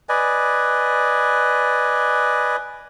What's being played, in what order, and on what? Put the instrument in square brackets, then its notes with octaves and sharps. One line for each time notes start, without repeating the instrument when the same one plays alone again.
[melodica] B4 D5 D#5 G#5